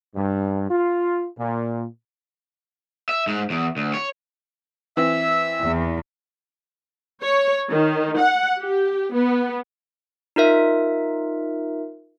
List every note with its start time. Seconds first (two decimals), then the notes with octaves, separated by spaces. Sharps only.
0.15 G2
0.70 F4
1.38 A#2
3.09 E5
3.27 G#2
3.50 E2
3.77 D2
3.94 C#5
4.97 E3 C4 E5 E6
5.61 E2
7.22 C#5
7.70 D#3
8.18 F#5
8.59 G4
9.13 B3
10.36 D#4 F4 A#4 E5